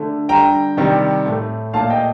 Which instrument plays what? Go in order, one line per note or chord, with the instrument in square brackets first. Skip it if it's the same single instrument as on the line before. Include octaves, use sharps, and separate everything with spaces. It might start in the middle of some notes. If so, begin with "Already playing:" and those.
Already playing: [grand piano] D3 A3
D3 G3 G5 A#5
C3 D#3 G3
A2 A3
A#2 A3 F5 A5
D#5 G5